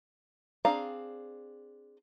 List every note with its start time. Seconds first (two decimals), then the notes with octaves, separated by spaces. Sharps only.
0.65 C4 D4 G#4 F5 A#5